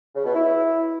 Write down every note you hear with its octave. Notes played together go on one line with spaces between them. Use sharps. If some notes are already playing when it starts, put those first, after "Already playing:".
C#3
B2
E4